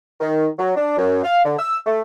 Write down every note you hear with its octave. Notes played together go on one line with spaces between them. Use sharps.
D#3
F#3
D4
F#2
F5
D3
E6
A3